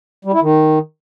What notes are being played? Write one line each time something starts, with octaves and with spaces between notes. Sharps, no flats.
G3
E4
D#3